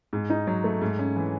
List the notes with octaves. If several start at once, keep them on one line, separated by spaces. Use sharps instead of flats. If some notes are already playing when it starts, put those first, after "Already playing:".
G#2
D#4
F#3
A3
G#2
C#4
E3